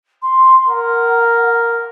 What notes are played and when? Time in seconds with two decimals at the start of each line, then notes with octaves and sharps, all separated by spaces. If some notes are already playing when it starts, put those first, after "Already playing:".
0.22 C6
0.69 A#4 F#5